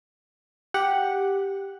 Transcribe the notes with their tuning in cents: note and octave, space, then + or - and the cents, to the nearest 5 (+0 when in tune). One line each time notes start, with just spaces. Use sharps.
G4 +0 F#5 +0